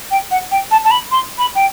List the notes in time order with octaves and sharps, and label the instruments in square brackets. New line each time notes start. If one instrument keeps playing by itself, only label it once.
[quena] G5
F#5
G5
A5
A5
B5
C6
B5
G5